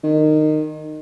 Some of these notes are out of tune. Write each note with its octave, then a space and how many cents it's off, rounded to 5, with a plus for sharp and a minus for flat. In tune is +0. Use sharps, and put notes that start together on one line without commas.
D#3 -20